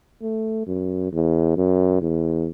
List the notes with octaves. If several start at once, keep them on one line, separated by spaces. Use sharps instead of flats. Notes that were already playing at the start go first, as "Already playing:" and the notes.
A3
F#2
E2
F#2
E2